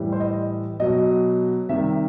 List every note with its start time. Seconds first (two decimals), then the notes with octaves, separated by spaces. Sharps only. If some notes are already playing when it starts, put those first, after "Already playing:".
Already playing: A2 E3 G3
0.13 C5
0.20 D#5
0.80 B2 F#3 D#5
1.69 C3 D#3 G3 E5